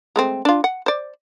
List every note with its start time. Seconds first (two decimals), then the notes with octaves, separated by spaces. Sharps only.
0.16 G#3 A3 C4
0.45 D4 F4
0.64 F#5
0.86 C5 D5